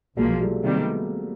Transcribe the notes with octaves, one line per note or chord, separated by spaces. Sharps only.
B1 A#2 F3 F#3 G#3 A#3
G3 A3
C3 D#3 G3 G#3 A#3
A3 B3